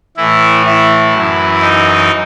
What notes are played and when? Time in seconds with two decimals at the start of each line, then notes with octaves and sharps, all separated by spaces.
0.17 A2 E3 E4
0.66 E4
1.14 F#2 E3
1.61 D#4